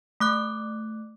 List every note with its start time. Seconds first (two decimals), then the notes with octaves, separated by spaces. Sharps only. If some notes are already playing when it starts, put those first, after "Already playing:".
0.20 A3 D6 F#6